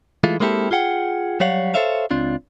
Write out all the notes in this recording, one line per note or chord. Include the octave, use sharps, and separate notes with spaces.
E3 G#3 A3 F4
G#3 A#3 C4 E4 G4 A4
F4 G#4 F#5 G5
F#3 G3 C#5 F5 F#5
A4 A#4 C5 C#5 E5 F5
C#2 C4 D4 F4